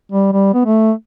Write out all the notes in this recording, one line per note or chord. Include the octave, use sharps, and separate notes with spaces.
G3
G3
B3
A3